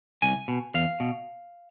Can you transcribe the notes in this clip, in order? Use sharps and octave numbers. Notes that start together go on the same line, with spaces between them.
C2 G#5
B2
E2 F5
B2